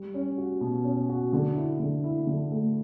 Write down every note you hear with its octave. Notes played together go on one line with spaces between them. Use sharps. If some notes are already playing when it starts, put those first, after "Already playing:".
Already playing: G3
C#4
F#4
B2
C#4
F#4
D3
E4
D3
E4
D3
A3